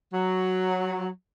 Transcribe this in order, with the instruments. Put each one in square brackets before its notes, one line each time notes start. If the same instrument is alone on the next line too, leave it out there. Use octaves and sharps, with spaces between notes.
[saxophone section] F#3